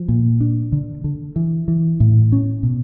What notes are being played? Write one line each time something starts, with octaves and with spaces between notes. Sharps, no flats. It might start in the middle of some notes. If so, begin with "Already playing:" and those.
Already playing: F3
A#2
D4
D3
D3
E3
E3
A2
C#4
B2